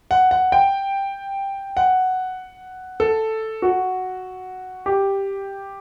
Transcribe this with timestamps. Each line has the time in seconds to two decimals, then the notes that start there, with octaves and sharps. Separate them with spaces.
0.11 F#5
0.31 F#5
0.52 G5
1.77 F#5
3.00 A4
3.62 F#4
4.86 G4